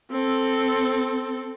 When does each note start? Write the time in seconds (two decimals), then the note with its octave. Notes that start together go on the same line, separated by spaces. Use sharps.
0.11 C4 A4